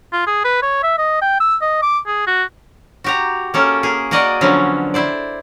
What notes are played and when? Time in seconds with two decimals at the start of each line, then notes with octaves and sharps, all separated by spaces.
0.13 F4
0.27 G#4
0.45 B4
0.62 C#5
0.83 E5
0.98 D#5
1.22 G5
1.40 E6
1.62 D#5
1.83 D6
2.07 G#4
2.27 F#4
3.04 F#4 G4 A#5
3.54 A#3 C#4 A4
3.83 A#3 G#4
4.11 A#3 F#4 D5 D#5 F#5
4.41 D3 F3 F#3 B3 C#4
4.94 E4 C5 D5